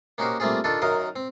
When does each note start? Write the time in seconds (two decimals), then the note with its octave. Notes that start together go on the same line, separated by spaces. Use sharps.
0.18 A#3 C#4 D#4 F#4 G4 C5
0.40 G3 A3 A#3 C4 F4 G#4
0.64 D#3 D4 F4 A4
0.82 F#2 D#3 F#3 A#4 D#5 F5
1.16 C4